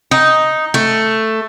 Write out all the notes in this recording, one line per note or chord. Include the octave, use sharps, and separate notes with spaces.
D#4
A3